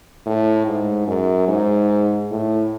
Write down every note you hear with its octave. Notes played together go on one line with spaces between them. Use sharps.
A2
G#2
F#2
G#2
A2